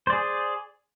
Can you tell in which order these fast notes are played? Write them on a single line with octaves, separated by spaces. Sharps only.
C5 D5 G#4